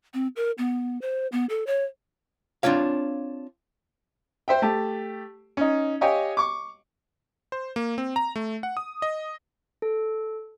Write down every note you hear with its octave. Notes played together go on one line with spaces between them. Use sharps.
C4
A#4
B3
C5
B3
A4
C#5
C4 D4 F4 C#5 F5
C5 E5 G5
A3 G4 A5
C#4 D#4
G4 C#5 D#5 F5 G5 G#5
C#6 D6
C5
A#3
C4
A#5
A3
F#5
D#6
D#5
A4